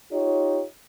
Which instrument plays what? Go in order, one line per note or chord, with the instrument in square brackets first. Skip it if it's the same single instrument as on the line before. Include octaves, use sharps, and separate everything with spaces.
[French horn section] D#4 F4 G4 C#5